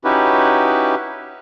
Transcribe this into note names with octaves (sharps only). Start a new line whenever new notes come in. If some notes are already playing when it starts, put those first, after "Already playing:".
C#4 D#4 E4 F#4 G4 B4